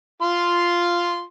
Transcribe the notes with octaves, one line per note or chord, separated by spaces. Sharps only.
F4 C6